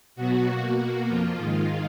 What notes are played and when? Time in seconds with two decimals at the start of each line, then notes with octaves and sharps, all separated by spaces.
0.16 B2 F#3 B3 F#4
0.46 B2 A#3
0.76 B2 A#3 F#4
1.07 F2 F3 A#3 F4
1.38 G#2 D#3 G#3